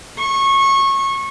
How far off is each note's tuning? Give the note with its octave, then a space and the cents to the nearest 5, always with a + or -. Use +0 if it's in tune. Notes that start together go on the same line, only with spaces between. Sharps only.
C#6 -20